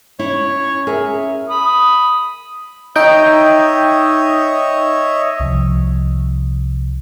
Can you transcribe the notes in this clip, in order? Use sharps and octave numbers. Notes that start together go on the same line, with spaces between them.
C#4 E4 C#5
G#4 A#4 E5
B5 D#6
D#4 C#5 D#5 E5 G5 G6
C2 C3 F3